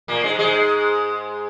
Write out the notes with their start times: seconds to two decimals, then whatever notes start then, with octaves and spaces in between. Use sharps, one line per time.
0.08 A#2 A#3
0.23 G#2 G#3
0.39 G#2 G#3